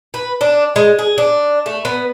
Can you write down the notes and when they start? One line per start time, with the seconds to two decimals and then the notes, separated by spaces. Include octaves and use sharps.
0.14 B4
0.41 D4
0.76 G#3
0.99 G#4
1.18 D4
1.66 A3
1.85 B3